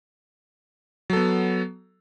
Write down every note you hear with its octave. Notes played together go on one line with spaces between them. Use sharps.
F#3 B3 A4